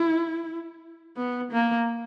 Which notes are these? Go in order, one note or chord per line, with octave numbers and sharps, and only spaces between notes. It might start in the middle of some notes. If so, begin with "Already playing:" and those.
Already playing: E4
B3
A#3